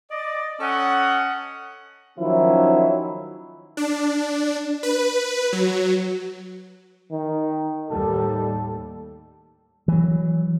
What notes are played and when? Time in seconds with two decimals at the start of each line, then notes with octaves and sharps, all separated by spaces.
0.11 D5 D#5
0.60 C#4 A4 D#5 F#5
2.18 D#3 F3 F#3 C#4 E4
3.77 D4
4.83 B4
5.52 F#3
7.12 D#3
7.90 D#2 A2 G3 A4
9.88 E3 F#3